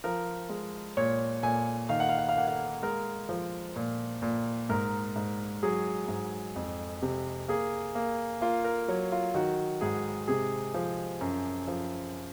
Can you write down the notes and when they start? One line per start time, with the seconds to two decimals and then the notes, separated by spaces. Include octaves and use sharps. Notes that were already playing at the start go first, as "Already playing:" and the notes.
0.04 F3 A#4
0.50 G#3
0.97 A#2 C#5
1.43 A#2 G#5
1.89 D#3 F5
2.00 F#5
2.09 F5
2.18 F#5
2.29 F5
2.37 A#3 F#5
2.48 F5
2.83 G#3 A#4
3.29 F3
3.76 A#2
4.22 A#2
4.69 G#2 A#4
5.16 G#2
5.63 F#3 G#4
6.08 G#2
6.56 F2
7.02 C3
7.48 A#3 G#4
7.95 A#3
8.41 A#3 F4
8.65 A#4
8.88 F#3 C#5
9.12 F4
9.34 D#3 F#4
9.81 G#2 G#4
10.28 C3 G#4
10.74 F3
11.21 F#2
11.67 F3